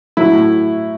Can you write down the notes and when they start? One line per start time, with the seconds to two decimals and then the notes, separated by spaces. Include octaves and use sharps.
0.17 F#3 E4
0.32 A2